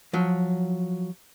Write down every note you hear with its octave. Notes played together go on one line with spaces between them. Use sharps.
F3 F#3